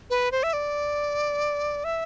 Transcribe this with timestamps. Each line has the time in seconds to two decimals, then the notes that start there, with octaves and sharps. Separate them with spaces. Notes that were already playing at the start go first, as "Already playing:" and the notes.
0.10 B4
0.32 C5
0.43 E5
0.53 D5
1.84 E5